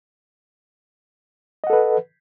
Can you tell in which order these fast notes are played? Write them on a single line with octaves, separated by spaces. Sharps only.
D#5 F#5 A4 B4